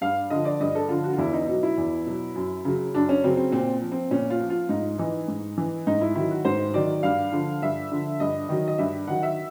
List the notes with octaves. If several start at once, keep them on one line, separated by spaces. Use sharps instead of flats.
G2 F5
D3 F3 D#5
D5
G2 D#5
A4
D3 F3 F4
F#4
F4
E2 E4
D#4
B2 F#3 D#4
E4
E2
B2 F#3
F#2
C#3 F#3
F#2 D4
C#4
C#3 F#3 C4
C4
A#2 C4
F3
C4
A#2 C#4
F4
F3
F4
G#2 D#4
E3 D#4
G#2
E3
G#2 D#4
E4
D#3 F#3 E4
F#4
G#2 C5
D#3 F#3 D5
G2 F5
D3 F3
G2 E5
D3 F3
G2 D#5
D#3 F#3
D#5
G2 E5
D#3 F#3 F#5
E5